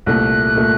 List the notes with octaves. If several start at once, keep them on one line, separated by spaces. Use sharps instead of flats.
C2 A#2 A3 F#6
A#2 A3